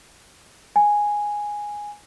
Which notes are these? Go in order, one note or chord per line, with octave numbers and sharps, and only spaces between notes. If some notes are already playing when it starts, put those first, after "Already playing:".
G#5